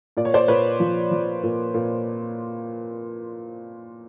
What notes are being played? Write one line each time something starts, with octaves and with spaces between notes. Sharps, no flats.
A#2 D5
C#5
C5 D5
A#2 B4 C#5
F3
F3
A#2
A#2